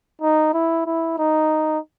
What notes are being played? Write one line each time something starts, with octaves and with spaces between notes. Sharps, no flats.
D#4
E4
E4
D#4